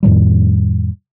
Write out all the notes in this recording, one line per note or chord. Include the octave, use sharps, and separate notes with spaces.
F2 A2 D#3 G3